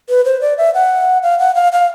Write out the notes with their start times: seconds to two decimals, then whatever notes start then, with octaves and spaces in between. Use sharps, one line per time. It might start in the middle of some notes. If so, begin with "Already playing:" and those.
0.09 B4
0.25 C5
0.41 D5
0.58 E5
0.74 F#5
1.23 F5
1.39 F#5
1.55 F5
1.72 F5